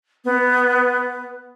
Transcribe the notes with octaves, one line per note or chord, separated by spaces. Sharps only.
B3